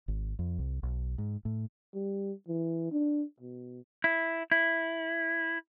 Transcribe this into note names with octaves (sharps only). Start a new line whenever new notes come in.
G#1
F2
C2
B1
G#2
A2
G3
E3
D4
B2
E4
E4